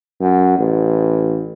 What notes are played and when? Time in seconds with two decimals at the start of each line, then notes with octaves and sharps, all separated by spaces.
0.20 F#2
0.58 A1